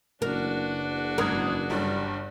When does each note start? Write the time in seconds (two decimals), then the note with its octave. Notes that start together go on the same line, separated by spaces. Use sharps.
0.22 F#1 E3 D4 F#4 A#4
1.18 G#1 A#4 D#6 G#6
1.70 G1 G2 G3